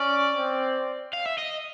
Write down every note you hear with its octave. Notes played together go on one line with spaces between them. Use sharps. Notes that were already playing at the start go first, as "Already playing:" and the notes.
Already playing: C#4 D5
C4
F5
E5
D#5